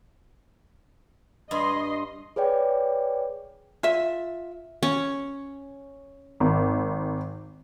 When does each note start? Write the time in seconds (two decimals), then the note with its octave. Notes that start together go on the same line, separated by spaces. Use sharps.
1.51 G2 D#5 C6
2.36 G#4 B4 C#5 D5 G5
3.83 F4 E5
4.83 C#4
6.40 G#1